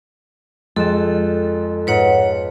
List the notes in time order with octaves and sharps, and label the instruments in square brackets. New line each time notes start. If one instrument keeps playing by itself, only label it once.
[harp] F2 E7 [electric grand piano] G#3 [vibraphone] A4
[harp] G#2 F4 [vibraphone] B4 C#5 F#5